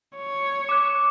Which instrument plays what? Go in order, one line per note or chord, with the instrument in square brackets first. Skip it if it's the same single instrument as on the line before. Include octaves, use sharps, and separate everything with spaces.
[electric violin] C#5
[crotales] D6 F#6